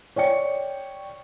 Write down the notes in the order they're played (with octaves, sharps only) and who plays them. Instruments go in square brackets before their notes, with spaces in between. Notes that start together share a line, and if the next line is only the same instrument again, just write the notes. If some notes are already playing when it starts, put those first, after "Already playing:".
[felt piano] C#5 D5 G5 C#7